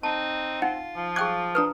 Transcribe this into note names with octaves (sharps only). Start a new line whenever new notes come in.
C4 D#4 A5
D#4 F4 F#5
F3
G#4 G5 D6 F#6 G#6
D4 B4 A#5 D#6 F6